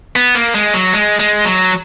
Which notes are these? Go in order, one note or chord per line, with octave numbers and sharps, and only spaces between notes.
B3
A#3
G#3
F#3
G#3
G#3
F#3